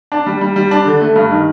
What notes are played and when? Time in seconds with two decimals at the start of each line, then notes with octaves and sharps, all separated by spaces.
0.12 D4
0.26 G3
0.41 G3
0.56 G3
0.71 D4
0.86 D3
1.01 A3
1.16 G2
1.30 D#3